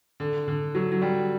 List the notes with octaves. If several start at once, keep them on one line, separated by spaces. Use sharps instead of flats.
D3
D3
F#3
F#3
G3